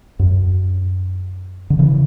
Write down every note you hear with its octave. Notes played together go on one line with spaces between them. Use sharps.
F#2
D3
C#3 E3